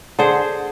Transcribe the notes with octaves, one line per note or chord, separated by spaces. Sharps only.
D3 G#4 C5